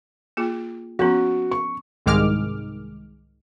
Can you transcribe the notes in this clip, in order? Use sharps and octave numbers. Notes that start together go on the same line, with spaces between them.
A#3 F4 G#4
F3 B3 C#4 F#4
C#6
C2 G#2 D#3 G#3 D6 F6